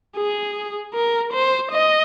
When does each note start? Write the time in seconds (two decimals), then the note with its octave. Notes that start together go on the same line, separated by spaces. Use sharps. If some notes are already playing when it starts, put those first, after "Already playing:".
0.17 G#4
0.94 A#4
1.33 C5
1.71 D#5